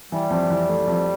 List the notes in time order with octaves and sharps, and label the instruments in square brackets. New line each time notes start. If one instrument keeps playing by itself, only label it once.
[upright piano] E3 [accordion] G3
[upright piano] F2
E3
A3
F2